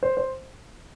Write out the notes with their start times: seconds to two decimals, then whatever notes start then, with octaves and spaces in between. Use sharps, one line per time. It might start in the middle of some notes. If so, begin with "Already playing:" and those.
0.03 C5
0.17 C5